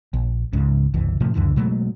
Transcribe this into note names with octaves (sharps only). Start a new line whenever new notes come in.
A#1
C#2 G#2 C#3
F#1 C2 E3
A2 C3 F3 A3
C#2 F#2 D3 E3
B2 F#3 G#3 A3